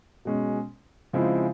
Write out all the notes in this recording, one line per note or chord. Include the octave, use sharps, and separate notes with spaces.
B2 G#3 C#4
C#3 F3 G#3 C4 E4